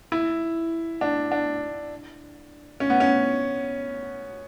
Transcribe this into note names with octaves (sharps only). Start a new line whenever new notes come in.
E4
D4
D4
C#4
B3
C#4